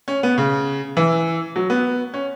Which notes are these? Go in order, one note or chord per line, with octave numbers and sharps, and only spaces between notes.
C#4
B3
C#3
E3
F#3
B3
C#4